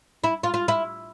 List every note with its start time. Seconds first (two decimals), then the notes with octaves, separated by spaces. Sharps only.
0.24 E4
0.43 F4
0.54 F4
0.68 E4